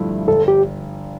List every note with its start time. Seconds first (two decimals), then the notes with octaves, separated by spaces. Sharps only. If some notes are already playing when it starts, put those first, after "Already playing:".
Already playing: G1 G2 F3 A3 E4
0.28 G1 A4
0.48 G4